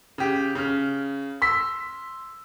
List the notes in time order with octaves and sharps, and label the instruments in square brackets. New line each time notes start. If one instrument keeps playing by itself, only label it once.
[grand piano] C#3 G4
C#3 F6
C6 E6 B6